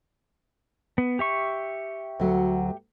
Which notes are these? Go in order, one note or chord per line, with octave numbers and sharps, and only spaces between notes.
B3
G4 E5 C#6
D2 F#3